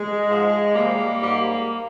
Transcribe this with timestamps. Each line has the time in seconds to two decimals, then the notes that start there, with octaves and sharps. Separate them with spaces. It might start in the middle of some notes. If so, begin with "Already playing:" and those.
Already playing: G#3
0.28 G#2 F3
0.75 C3 F3 G3 A#3
1.20 G#2 G3